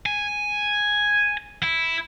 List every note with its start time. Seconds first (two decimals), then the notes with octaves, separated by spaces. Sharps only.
0.06 G#5
1.63 E4